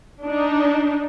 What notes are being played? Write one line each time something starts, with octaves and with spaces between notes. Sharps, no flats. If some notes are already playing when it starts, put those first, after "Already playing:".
D4 D#4